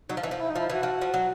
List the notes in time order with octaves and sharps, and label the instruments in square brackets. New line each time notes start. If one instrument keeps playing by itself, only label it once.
[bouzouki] F#3 [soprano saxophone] D#4
[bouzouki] F3
E3
F3
[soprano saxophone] E4
D#4
[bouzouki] F3 [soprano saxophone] E4
[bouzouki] E3 [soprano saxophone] F#4
[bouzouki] F3
F3
F#3